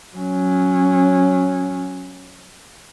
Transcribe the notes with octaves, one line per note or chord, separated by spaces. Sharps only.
F#3 C#4